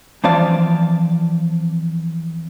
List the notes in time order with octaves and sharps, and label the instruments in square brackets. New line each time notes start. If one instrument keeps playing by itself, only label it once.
[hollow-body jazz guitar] E3 F3 C4 D5 F5 A5